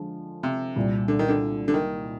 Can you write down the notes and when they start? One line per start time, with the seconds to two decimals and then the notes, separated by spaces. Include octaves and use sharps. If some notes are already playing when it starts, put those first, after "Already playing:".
Already playing: D3 F3 G#3
0.43 C3
0.76 C2 A#2 G3
1.08 D3
1.19 D#3
1.28 D3
1.68 D3
1.74 D#3